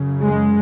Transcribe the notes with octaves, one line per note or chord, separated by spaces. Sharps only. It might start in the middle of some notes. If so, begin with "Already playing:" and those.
Already playing: F#2 C#3
G#3